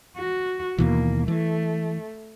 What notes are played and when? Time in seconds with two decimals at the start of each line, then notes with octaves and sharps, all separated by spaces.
0.17 F#4
0.78 D#2 B2 E3 A#3
1.28 E3 A3